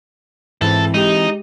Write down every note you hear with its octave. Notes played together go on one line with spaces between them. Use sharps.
G#2 E3 C4 A4
G#3 D#4 G4